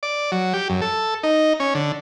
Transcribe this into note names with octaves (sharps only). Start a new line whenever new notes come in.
D5
F#3
G4
F#2
A4
D#4
C#4
D3